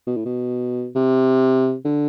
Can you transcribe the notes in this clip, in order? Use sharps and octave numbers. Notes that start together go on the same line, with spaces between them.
B2
A2
B2
C3
D3